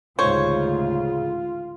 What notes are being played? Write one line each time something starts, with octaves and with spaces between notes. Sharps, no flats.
A1 D2 G#2 C#3 G#3 F4 C5 C#5